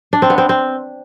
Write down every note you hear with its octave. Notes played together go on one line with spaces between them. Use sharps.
D4
C4
B3
C4
C4